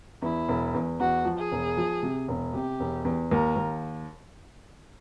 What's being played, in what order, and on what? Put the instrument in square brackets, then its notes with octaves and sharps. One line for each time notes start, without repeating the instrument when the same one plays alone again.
[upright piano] E2 [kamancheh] E4
[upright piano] E1
E2
[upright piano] E2 [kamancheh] F#4
[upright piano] F3
[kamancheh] G#4
[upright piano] E1
F3
C3
E1
[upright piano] C3 [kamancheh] G4
[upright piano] E1
E2
[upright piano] D#2 [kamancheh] A#4
[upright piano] D#2